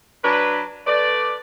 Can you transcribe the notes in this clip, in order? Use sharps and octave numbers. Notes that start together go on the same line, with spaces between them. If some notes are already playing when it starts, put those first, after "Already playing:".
F#3 D4 B4
A3 B4 D5